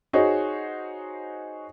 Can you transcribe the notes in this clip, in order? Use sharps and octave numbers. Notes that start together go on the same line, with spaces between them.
D#4 F#4 G#4 C5 C#5